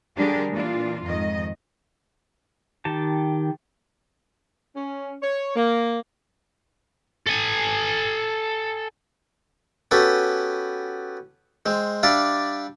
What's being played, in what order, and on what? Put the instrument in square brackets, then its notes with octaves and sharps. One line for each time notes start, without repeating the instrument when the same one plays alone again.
[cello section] D3 G3 D4 G4 G#4 A#4
A#2 E3 D4 F4
F2 G#2 D#3 D#5
[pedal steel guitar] D#3 G4 A5
[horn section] C#4
C#5
A#3
[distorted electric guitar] A4 G#5
[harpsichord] B3 C#4 F#4 G4 A4 B4
G#3 C4
G3 D4 D5 E5 F5